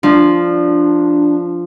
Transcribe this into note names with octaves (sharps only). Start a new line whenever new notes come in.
F3 D4